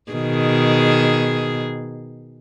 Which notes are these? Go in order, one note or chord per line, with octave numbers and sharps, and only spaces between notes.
B2 D#3 G#4